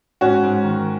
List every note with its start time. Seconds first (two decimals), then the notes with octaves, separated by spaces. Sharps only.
0.21 G#2 C#4 F#4
0.43 G#2
0.64 D#3